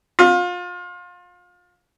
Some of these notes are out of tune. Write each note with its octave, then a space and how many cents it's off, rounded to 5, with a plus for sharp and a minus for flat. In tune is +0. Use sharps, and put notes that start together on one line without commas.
F4 +30